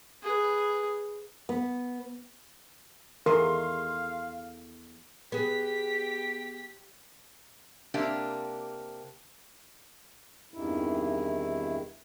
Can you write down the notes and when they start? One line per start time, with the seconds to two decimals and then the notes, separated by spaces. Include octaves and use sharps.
0.23 G#4 B4
1.49 B3
3.26 E2 A3 A#4 D#5 F5 C6
5.32 B3 G4 G#4 B6
7.94 C3 A#3 D4 G4 D5
10.54 E2 G2 C3 D#3 E4